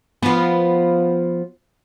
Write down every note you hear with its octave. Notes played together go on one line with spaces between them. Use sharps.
F3 B3